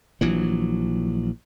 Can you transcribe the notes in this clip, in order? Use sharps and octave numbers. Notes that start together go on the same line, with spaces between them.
A#1 E3 F#3